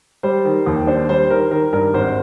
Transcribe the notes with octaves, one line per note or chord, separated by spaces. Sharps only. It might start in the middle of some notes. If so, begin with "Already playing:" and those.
G3 C5
D#3
D#2
D4 C5
G3 C5
D#3 A#4
D#3 A#4
G2 A#4
G#1 C5